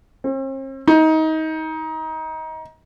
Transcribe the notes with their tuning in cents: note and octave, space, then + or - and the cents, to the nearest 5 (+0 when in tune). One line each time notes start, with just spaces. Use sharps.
C4 +45
D#4 +25